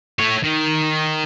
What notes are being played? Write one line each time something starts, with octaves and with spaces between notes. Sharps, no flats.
A3 C#5
D#3